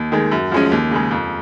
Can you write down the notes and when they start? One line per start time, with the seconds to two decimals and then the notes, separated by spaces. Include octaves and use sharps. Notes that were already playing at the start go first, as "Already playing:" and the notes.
Already playing: D#2
0.12 D#3 G#3
0.31 F#2
0.52 F3 G#3 C#4
0.72 D#2
0.91 C#3 G#3
1.11 F2